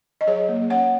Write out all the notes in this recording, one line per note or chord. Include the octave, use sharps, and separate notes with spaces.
D#5
F#3 G#4 C#5
A#3
C#4 C#5 F#5